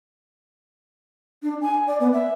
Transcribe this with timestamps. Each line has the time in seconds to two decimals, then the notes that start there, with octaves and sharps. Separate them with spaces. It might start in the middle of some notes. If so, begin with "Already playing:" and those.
1.43 D4
1.61 G#5
1.87 D5
2.00 B3
2.13 E5